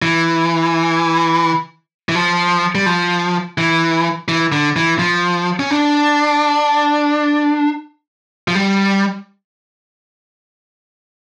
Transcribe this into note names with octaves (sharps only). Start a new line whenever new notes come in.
E3
E3
F3
G3
F3
E3
E3
D3
E3
F3
C#4
D4
F3
G3